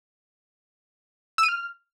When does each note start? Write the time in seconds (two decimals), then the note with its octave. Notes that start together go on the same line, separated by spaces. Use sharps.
1.38 E6
1.43 D#7
1.48 F6